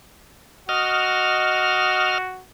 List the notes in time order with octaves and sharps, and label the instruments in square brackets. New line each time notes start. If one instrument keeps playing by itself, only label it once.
[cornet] F#4 [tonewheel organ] D#5 F6